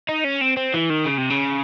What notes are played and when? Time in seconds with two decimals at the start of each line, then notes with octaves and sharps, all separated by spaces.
0.09 D#4
0.24 C#4
0.41 C4
0.57 C4
0.74 E3
0.90 D#3
1.05 C#3
1.18 C3
1.30 C#3